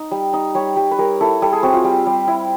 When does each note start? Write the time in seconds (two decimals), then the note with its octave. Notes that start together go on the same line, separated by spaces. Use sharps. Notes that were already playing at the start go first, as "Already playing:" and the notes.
Already playing: D#4
0.11 G3
0.33 D#4
0.55 G3 C#5
0.76 G3
0.91 B4
0.98 G3 A#4
1.21 E4 A4
1.42 G3 A4
1.52 G#4
1.63 C4 F#4
1.73 F4
1.84 G3
2.06 G3
2.27 E4